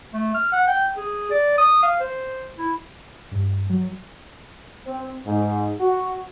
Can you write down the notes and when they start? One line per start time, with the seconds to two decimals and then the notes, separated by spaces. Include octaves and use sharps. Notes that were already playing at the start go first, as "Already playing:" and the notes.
0.14 A3
0.34 F6
0.52 F#5
0.67 G5
0.96 G#4
1.31 D5
1.58 D#6
1.83 F5
2.00 C5
2.57 E4
3.31 G2
3.70 F#3
4.87 C4
5.27 G#2
5.80 F#4